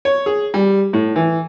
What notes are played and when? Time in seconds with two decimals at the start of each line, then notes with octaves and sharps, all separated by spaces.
0.05 C#5
0.26 G#4
0.54 G3
0.93 A2
1.16 E3